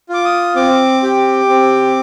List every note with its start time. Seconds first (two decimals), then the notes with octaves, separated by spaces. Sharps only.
0.09 F4 D6
0.25 D#6
0.56 C4 D6
1.03 G4
1.49 C4